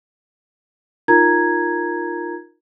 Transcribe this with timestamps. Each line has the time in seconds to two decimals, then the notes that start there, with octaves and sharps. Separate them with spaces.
1.08 D#4 F4 A#4 A#5 G#6